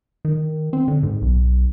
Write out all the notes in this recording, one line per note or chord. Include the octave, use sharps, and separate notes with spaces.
D#3
C4
D3
G#2
B1